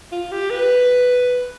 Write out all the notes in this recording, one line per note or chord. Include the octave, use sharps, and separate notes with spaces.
F4
G4
B4